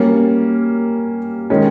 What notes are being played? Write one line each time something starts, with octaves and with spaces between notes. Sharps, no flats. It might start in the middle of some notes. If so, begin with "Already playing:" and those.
Already playing: G3 A#3 C#4
D#3 G#3 C#4